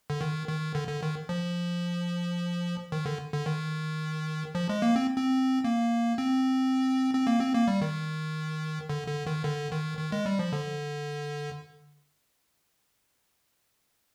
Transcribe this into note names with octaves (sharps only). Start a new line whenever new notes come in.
D3
D#3
D#3
D3
D3
D#3
F3
D#3
D3
D3
D#3
F3
G#3
A#3
C4
C4
A#3
C4
C4
A#3
C4
A#3
G3
D#3
D3
D3
D#3
D3
D#3
D#3
G#3
G3
F3
D3